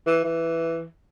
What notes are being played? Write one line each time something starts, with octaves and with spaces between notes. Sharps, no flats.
E3
E3